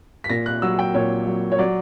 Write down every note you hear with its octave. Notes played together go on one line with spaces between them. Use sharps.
B6
A#2 A#6
F#6
F#3 E6
G5
A#2 C#5
F#3
C#5
F#3 D5